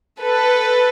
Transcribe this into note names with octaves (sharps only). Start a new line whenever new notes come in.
A4 B4